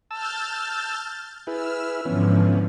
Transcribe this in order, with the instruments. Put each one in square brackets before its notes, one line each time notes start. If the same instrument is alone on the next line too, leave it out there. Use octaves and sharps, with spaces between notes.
[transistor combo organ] A5 E6 [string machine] F6 G6 A6
[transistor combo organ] E4 G#4 B4 [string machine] E6 F6
[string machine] G#2 D3 F3 [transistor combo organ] E3 B3 C#4